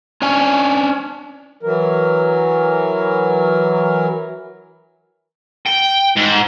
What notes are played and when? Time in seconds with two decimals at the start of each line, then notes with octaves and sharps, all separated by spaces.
0.22 C#4 D4 G#5
1.63 E3 F#3 A#4
5.66 G5
6.16 G#2